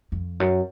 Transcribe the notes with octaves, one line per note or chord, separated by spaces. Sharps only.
F2
F#2